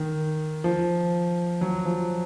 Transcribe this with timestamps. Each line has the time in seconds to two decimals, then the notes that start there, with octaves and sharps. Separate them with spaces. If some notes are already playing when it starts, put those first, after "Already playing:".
Already playing: D#3
0.64 F3
1.61 F#3
1.85 F3